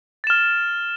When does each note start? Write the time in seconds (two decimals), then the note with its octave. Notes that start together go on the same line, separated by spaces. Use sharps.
0.24 A6
0.27 E7
0.30 F6